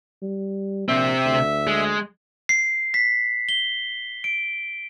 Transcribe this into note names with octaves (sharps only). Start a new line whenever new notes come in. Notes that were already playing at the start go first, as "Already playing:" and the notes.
G3
A#1 C3 C4 E5
D2
G#3
C7
B6
G7
D7